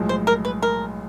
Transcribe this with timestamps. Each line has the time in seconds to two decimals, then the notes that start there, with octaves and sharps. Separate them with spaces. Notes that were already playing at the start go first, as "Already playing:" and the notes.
Already playing: B1 A2 F3 G#3
0.09 C5
0.27 A#4
0.45 B4
0.62 A#4